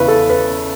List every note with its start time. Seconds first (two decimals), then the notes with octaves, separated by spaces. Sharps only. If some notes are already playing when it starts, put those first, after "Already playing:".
Already playing: E2 C#3 B4
0.08 A4
0.30 B4